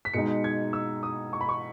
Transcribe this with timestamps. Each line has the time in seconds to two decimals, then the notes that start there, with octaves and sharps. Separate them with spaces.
0.05 B6
0.14 B2 G#3 D#4 C#7
0.44 G#6
0.73 E6
1.03 D#6
1.33 C#6
1.41 B5
1.49 C#6